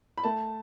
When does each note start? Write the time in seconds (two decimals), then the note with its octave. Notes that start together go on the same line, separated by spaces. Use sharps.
0.18 B5
0.23 A3 A5